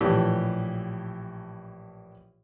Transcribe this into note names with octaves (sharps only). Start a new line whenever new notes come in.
A#1 A2 E3 G4